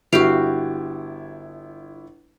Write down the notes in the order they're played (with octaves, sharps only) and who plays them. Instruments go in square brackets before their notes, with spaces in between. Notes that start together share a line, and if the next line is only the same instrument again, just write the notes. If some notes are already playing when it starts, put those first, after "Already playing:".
[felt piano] G1 E4 D7 [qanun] F#4 G4 F5